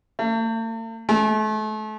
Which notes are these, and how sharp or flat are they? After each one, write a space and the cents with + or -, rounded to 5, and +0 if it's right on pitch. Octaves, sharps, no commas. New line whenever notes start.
A3 +45
A3 -35